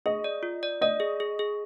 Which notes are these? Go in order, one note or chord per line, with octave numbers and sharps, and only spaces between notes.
G#4 D#5
D5
F4
D5
D5 D#5
G#4
G#4
G#4